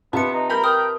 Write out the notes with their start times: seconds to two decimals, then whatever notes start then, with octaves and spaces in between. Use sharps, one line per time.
0.13 C3 B3 F4 B4 A5 C#7
0.33 D#4
0.49 A#4 A#5 B5 G6
0.64 A#4 G5 D#6 F6